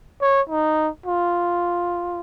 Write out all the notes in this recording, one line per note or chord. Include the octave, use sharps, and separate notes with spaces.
C#5
D#4
F4